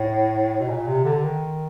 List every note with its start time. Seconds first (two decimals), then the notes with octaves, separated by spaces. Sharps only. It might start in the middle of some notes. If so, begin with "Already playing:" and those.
Already playing: A2
0.60 B2
0.69 A#2
0.87 C3
1.05 D3
1.22 D#3